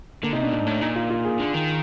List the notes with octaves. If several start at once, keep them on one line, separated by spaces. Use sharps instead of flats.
D3 A#3
C3 D#4
B2 D4
A#2
G#2
A2
A#2 D#4
F4
F4
G#4
D3
D#3